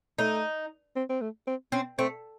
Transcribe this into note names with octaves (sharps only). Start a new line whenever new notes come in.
A3 D#4
C4
C4
A3
C4
C4 C#4
A3 C4